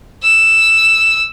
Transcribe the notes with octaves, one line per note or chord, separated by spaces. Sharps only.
E6